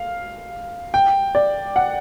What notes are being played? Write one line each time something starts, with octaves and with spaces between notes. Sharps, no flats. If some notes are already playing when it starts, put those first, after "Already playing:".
Already playing: F5
G5
D5
F#5